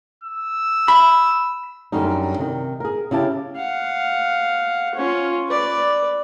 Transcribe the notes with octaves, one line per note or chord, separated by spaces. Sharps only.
E6
B5
F#2 D3 G3 C#4 D#4
C3 D#3
G#4 A#4
C#3 C#4 E4 G4 A5
F5 F#5
C#4 F4
B4 D5